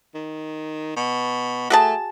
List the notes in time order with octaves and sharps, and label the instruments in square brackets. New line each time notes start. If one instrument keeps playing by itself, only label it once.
[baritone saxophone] D#3
B2
[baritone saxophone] A3 [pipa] F#4 G#4 A5